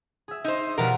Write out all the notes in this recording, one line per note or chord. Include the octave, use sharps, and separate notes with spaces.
G#4 E5
D#4 C5
B2 F3 G3 B3 F#4 A#4